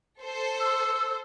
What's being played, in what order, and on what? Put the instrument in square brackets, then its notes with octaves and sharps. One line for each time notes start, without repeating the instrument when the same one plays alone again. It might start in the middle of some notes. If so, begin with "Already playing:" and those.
[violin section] A4 C5
[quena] E6